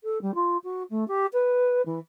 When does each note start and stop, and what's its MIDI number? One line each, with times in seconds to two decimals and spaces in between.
0.04 0.21 69
0.22 0.34 55
0.34 0.57 65
0.64 0.83 66
0.90 1.07 57
1.08 1.26 67
1.33 1.82 71
1.86 1.99 52